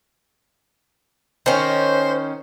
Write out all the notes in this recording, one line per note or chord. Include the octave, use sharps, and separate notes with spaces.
D#3 C#4 C5